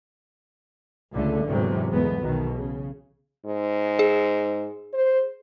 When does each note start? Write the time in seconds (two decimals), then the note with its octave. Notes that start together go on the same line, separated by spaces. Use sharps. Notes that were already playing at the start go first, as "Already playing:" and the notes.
1.12 C#2 D3 A3
1.45 E2 G#2 C3 F#3
1.91 G1 E2 G#3 B3
2.21 B1 E2 B2 D#3
2.55 C#3
3.46 G#2
3.99 G#4
4.94 C5